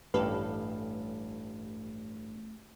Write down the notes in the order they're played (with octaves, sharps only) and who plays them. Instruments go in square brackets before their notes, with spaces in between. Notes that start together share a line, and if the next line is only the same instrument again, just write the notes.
[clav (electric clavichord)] A1 G2 F5 [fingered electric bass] A3 [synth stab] G4 A4 B4